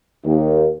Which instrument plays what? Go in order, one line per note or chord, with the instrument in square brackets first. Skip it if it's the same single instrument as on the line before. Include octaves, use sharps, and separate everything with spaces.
[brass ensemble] D#2